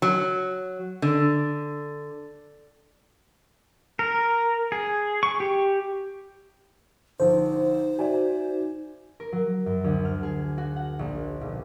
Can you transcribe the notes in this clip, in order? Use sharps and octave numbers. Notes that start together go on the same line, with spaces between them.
F#3
D3
A#4
G#4
C#6
G4
A#1 D3 D#4 C5
F#4 D5 E5 G#5
A#4
F#3
F#2
D2
F6
G#4
F#4
F#5
A#1
B1